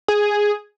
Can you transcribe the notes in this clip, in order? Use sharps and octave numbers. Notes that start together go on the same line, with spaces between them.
G#4